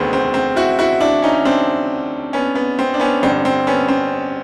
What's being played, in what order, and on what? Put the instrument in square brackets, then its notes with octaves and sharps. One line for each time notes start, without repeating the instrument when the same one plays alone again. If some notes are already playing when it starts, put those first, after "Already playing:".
Already playing: [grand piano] E1 D2 C3 D#3 B3 C4
C4
C4
E4 F#4
E4 F#4
D4 E4
C#4 D#4
C#4
C4 D4
B3 C#4
B3
C4
D4
B3 C#4
A1 G2 D3 C4
C4
B3 C#4
C4